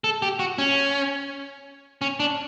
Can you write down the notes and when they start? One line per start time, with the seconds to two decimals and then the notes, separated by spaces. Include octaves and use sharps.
0.04 A4
0.22 G4
0.39 F#4
0.58 C#4
2.02 C#4
2.20 D4